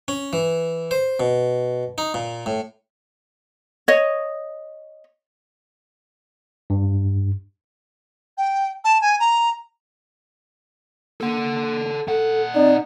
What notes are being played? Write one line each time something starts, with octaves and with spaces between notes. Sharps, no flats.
C#4
E3
C5
B2
D#4
A#2
A2
C#5 D#5
G2
G5
A5
G#5
A#5
A#3 A4 F#5
A#2 A4 F#5
C4 D#4 D5